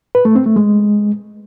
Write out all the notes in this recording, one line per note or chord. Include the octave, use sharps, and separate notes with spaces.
B4
A3
C4
A3
G#3